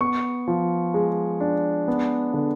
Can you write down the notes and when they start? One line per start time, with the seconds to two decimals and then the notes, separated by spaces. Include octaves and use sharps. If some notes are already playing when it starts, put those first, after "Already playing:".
0.01 B3 C#6
0.48 F3
0.94 G#3
1.40 D4
1.88 B3
2.34 D3